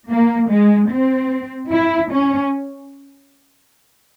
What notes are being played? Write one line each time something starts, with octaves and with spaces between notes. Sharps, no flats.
A#3
G#3
C4
E4
C#4